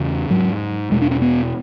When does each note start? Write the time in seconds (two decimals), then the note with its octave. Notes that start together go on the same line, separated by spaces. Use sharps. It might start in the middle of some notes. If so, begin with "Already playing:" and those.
Already playing: E2 C#3
0.30 G#2 F#3
0.91 E2 B2 G#3
1.02 D4
1.11 C#4
1.22 B3